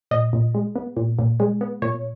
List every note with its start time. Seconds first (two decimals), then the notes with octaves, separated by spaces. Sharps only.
0.11 A#2 D#5
0.33 A#2
0.55 G#3
0.76 B3
0.97 A#2
1.19 A#2
1.40 G#3
1.61 B3
1.82 A#2 C#5